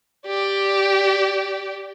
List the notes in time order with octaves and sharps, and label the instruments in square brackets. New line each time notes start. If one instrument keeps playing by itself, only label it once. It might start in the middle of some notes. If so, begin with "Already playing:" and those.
[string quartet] G4 D5